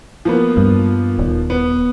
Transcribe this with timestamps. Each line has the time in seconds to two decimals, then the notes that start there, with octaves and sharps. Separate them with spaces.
0.25 F3 A#3 B3
0.57 G2
1.19 D#1
1.50 B3